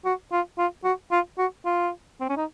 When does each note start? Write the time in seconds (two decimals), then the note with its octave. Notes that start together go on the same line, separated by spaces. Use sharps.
0.05 F#4
0.32 F4
0.58 F4
0.84 F#4
1.11 F4
1.38 F#4
1.65 F4
2.20 C4
2.29 C#4
2.37 D#4